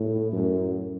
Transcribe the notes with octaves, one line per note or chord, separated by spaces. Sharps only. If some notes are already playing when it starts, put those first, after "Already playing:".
Already playing: A2
F#2